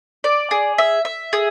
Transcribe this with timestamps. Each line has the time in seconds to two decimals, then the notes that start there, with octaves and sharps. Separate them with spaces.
0.24 D5
0.51 G#4
0.78 E5
1.05 E5
1.33 G#4